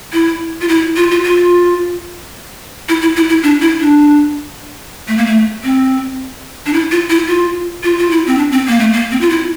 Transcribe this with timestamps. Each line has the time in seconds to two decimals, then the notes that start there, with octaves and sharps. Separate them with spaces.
0.13 E4
0.61 F4
0.68 E4
0.96 F4
1.11 F4
1.23 F4
2.89 E4
3.02 E4
3.16 E4
3.29 E4
3.43 D4
3.62 E4
3.80 D4
5.08 A3
5.17 A#3
5.26 A3
5.64 C4
6.66 D4
6.73 E4
6.91 F4
7.10 E4
7.28 F4
7.83 F4
7.98 F4
8.11 E4
8.27 C4
8.38 D4
8.52 C4
8.68 A#3
8.80 A3
8.93 A#3
9.11 C4
9.21 F4
9.30 E4